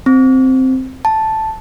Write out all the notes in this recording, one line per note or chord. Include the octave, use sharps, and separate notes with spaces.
C4
A5